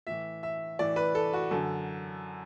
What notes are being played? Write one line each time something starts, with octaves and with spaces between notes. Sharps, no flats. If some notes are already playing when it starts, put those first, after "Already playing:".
A2 E3 E5
E5
A2 E3 D5
B4
A4
F#4
F#2 D3 A4